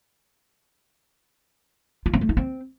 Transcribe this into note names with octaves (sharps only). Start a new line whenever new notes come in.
F4
C4
A3
D#4
C4